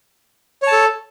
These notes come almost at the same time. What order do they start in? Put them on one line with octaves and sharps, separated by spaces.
C#5 A5 A4